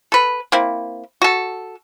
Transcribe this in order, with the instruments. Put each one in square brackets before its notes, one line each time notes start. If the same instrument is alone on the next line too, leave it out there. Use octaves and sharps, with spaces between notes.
[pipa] A4 B4
A#3 C4 E4
F#4 A4